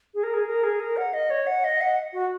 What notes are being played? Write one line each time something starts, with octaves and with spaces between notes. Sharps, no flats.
G#4
A#4
G#4
A#4
G#4
A#4
F#5
D#5
C#5
F#5
D#5
F#5
F#4